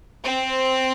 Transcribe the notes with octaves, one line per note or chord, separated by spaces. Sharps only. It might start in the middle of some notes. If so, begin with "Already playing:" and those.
C4